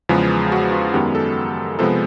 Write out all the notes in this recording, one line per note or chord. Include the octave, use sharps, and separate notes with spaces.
E2 C#3 F3 G#3 B3
F#4
F4
F#2 D#3 G#3 B3 G4
A4
C3 F3 G#3 B3 A4